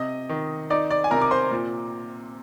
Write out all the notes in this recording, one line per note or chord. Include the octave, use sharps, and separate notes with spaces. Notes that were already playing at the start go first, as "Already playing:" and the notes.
Already playing: C3 D#5 D#6
D#3
D#4 D5 D6
D5 D6
G#5
C3 A#4 A#5
D6
C5 C6
A#2